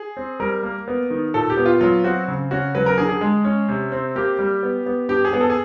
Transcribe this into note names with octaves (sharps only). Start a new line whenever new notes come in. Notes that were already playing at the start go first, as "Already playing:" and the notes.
Already playing: G#4
C4
G3 A#4
A#3
B3
D#3
A#2 A4
G4
B3
F4
F#3 F4
C4 F#4
C#3
C#4 F#4
F#3 B4
A#4
D3 G#4
G#4
G#3
C#4
C3
C4
A#3 G4
G3
B3
B3
G2 G4
G#4
B3
A4
G#4